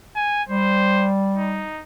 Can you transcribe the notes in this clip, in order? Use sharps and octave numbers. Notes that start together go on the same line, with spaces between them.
G#5
G3 C5
D#4